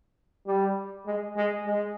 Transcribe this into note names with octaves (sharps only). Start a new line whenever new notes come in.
G3
G#3
G#3
G#3